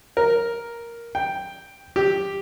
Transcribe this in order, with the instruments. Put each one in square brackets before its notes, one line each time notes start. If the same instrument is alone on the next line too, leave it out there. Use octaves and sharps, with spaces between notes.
[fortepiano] A#4
G5
G4